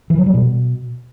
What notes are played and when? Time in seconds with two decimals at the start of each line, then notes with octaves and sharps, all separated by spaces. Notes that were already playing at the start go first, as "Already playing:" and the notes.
0.10 E3
0.18 F#3
0.26 G3
0.34 B2